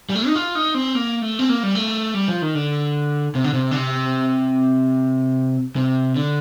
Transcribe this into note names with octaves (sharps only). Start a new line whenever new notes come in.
G3
A3
D#4
F4
D#4
C4
A#3
A3
C4
A#3
G3
A3
G3
F3
D#3
D3
C3
D3
C3
D3
C3
C3
D3